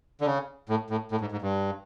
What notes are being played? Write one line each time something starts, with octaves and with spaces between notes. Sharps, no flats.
D3
C#3
A2
A2
A2
G#2
G#2
G2